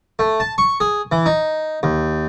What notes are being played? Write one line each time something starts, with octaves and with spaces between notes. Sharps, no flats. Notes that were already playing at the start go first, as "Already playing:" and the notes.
A3
A5
C#6
G#4
E3
D#4
D#2